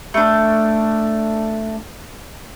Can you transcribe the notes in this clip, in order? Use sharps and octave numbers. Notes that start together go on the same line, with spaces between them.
A3 D4